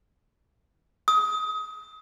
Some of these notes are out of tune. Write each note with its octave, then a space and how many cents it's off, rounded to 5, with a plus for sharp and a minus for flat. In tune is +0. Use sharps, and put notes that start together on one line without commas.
D#6 +25